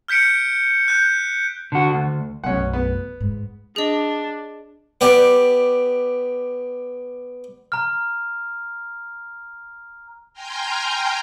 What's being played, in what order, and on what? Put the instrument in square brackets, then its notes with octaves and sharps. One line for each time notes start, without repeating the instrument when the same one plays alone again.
[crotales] F6 G6 B6 C#7 D7
F#6 G6
[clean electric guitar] D3 F#4
D2
[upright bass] B1 F#2 [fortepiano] C#4 F#5
[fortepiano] B3
[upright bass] G#2
[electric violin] D4 [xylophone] G#4 D#5
[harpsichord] B3 G4 D5
[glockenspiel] A#5 F6
[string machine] G5 G#5 A#5 C6 F6 G6